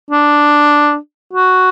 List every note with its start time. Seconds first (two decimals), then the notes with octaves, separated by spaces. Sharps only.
0.11 D4
1.34 F#4